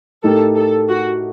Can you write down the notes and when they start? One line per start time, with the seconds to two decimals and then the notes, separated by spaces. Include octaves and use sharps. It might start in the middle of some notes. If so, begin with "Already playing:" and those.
0.24 A2 A3 D#4 G4 A4 A#4
0.56 A4
0.89 F#4